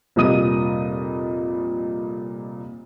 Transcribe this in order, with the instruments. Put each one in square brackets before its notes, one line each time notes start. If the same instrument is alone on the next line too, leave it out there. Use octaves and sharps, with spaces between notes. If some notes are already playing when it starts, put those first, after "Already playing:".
[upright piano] F1 A#2 G3 D#5 D#6 D#7